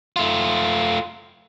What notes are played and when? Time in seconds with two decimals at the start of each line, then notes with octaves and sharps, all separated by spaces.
0.16 A3 F4